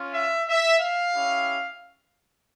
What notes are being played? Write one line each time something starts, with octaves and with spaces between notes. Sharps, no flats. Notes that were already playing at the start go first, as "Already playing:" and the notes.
Already playing: C#4 F4
E5
E5
F5
C#4 E4 G4